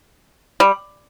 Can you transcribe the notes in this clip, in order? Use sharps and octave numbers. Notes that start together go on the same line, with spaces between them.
G3